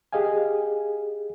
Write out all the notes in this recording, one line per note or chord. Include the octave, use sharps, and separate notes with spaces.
G4 G#4 D#5 F5 G#5